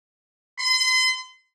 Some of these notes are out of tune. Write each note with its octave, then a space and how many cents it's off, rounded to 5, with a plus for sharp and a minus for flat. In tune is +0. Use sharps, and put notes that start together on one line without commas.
C6 -35